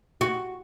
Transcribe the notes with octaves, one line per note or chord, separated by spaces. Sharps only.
F#4